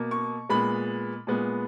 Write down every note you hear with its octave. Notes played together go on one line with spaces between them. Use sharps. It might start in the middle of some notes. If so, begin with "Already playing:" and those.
Already playing: B2 A#3
C#6
A#2 G#3 B3 B5
A#2 G#3 B3